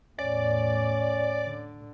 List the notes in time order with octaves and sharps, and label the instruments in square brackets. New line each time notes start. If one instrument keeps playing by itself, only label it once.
[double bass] E2 A2 [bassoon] C#4 [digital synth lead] D5
[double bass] D3